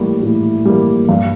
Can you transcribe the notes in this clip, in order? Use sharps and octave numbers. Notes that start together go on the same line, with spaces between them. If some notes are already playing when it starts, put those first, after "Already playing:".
Already playing: A2 G3 A#3
A2
G3 A#3
G2